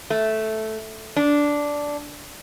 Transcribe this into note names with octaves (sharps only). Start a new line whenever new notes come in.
A3
D4